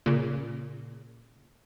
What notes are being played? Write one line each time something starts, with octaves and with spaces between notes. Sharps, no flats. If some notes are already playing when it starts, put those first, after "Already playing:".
A#2 C#3